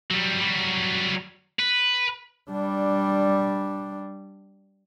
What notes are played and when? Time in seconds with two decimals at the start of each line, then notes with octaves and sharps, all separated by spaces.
0.10 F#3 G3
0.41 F#3 G3
1.59 B4
2.51 G3 D4